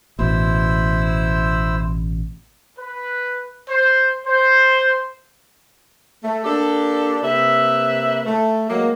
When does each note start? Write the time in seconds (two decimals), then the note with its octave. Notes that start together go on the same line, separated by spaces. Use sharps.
0.19 A1 B2 E4 C5 E6
2.79 B4
3.69 C5
4.27 C5
6.23 A3
6.44 A#3 D4 G4 A4
7.23 C3 A#3 B4 E5
8.25 A3
8.69 F#3 G#3 A#3